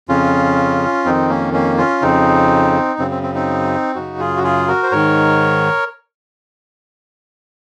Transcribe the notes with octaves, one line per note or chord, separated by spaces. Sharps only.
F2 C#3 C#4 F4
F2 D#3 C4 D#4
A#3 C#4
A#3 C#4
C#4 F4
F2 C#3 C4 D#4
F#2 C#3 C4
C4
C4
C4 D#4
F#2 C#3 D#4 F#4
F4 G#4
F#4
F4 G#4
F#4 A#4
C5
G#2 D#3 A#4 C#5